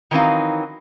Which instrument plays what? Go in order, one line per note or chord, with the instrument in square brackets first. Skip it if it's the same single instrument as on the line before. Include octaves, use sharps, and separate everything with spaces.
[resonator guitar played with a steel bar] D#3 E3 F#3 C4 D#4 F5